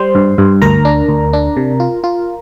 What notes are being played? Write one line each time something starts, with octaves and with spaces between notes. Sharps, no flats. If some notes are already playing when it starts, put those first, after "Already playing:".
Already playing: G3 C5 C6
G2
G2
D2 A#4 A#5
D4
D2
D4
C3
F4
F4